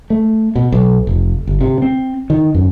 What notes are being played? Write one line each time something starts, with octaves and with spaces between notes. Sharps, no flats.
A3
B2
B1
F1
G1
C3
C4
D#3
F#2